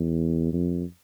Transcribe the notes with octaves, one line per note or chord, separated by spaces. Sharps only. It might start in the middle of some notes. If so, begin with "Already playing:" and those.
Already playing: E2
F2